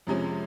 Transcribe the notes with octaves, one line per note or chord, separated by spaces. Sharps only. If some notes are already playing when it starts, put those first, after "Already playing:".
F2 C3 F3 G#3 C#4